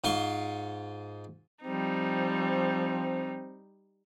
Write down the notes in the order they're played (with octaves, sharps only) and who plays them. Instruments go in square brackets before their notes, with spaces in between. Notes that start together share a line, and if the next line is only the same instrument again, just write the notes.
[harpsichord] G#2 F4 C6 C#6
[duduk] F3 [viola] G3 D#4 [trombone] C4